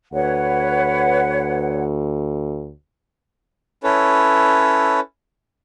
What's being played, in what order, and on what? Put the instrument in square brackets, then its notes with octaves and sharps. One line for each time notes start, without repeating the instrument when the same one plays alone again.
[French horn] D2 [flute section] B4 C#5 F#5
[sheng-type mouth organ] C#4 E4 A4 B4 C#5